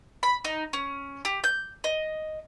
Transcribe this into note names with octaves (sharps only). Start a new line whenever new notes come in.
B5
D#4
C#4
G4
G6
D#5